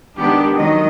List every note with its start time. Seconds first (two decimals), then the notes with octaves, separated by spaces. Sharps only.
0.17 D#3 G#3 B3 D4 G4
0.57 D#3 F#3 G#3 D#5